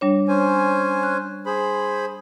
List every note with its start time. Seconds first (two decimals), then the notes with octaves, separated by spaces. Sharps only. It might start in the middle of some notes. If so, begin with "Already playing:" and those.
0.01 G3 D4 C#5
0.28 C#4 C5 G#5
1.03 F#6
1.46 G#4 C5 B5